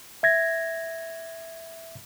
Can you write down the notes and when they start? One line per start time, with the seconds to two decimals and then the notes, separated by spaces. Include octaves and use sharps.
0.23 E5 G#6 A#6